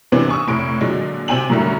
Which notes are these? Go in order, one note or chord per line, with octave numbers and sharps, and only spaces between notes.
G#2 C3 E3 B3 C4 D4
G#5 C#6 D#6 E6
F1 A2 C#6 D7
A#2 D3 F3 F#3 G#3
C3 C4 D5 G5 G#5 F#7
F#2 A2 D3 G3 A3